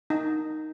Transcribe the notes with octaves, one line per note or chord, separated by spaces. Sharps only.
D#4